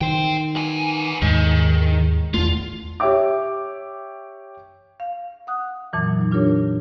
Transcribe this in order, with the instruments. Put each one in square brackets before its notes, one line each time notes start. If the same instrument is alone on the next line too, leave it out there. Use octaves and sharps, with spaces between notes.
[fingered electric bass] D#3 [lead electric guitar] C5 G5
[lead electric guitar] B3 G#5
[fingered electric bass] D#2 G#2 G#3 [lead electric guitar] D#3
[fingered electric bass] E2 A3 [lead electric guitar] F4
[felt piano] G4 C#5 E5 G5 D6
[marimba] F5
F#5 D#6 F#6
F2 A#2 E3 F#3
F#3 D#4
D4 F4 G4 A#4 C#5